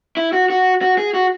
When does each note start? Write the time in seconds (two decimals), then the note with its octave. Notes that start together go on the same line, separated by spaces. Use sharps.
0.17 E4
0.33 F#4
0.50 F#4
0.82 F#4
0.98 G#4
1.14 F#4